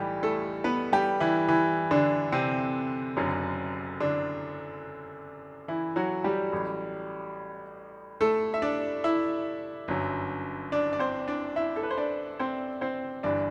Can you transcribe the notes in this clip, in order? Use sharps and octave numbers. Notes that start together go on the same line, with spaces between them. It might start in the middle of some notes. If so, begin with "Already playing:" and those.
Already playing: B1 A2 E3 G3 G4
A3 A4
B3 B4
G3 G4
E3 E4
E3 E4
D3 D4
C3 C4
F#1 F#2 D3 F#3
D3 D4
E3 E4
F#3 F#4
G3 G4
A1 A2 F#3
A3 A4
E5
D4 D5
E4 E5
G1 F#2 F#3
D4 D5
D5
C4 C5
D4 D5
E4 E5
A4
B4
C5
D4 D5
C4 C5
C4 C5
G1 G2 E3 D4 D5